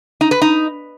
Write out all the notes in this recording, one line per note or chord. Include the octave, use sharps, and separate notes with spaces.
D#4
B4
D#4